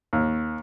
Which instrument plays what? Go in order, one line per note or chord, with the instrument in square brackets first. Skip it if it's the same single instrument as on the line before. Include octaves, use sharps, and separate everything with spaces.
[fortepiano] D#2